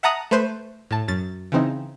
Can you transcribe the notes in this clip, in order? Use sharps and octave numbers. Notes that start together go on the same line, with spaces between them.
E5 F#5 A5 A#5 D#6 F#6
A3 B4 C5
A2 A5
F#2 A6
C#3 E3 C4 D#4